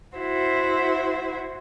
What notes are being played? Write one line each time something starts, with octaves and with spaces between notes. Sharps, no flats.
E4 F#4 C5 E5